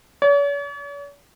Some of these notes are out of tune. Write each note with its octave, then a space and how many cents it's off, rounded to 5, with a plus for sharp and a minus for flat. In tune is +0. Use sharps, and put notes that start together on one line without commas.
C#5 +45